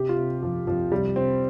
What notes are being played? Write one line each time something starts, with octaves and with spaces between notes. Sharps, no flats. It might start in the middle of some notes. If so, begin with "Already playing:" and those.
Already playing: C3 G4
F4
C3
F2 F3
F2 F3
C3 G3
C3 C4